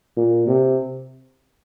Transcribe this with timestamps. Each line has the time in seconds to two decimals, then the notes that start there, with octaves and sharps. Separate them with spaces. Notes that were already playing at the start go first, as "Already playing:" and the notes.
0.17 A#2
0.47 C3